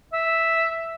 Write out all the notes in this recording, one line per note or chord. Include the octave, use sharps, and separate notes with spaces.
E5